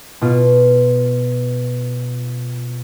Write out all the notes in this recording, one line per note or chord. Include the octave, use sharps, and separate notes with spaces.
B2 F4